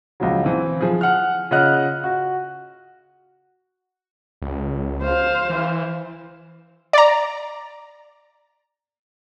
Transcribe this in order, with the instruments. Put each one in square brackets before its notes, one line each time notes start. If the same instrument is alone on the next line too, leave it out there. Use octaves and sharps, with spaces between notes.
[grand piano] C#2 F3 F#3
E3 C4
F3 G#4
F#5 F6
C#3 F4 D#5 F#5 F6 F#6
F#4
[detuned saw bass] C#2
[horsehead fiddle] C5 F5
[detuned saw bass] E3
[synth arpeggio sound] D5 A#5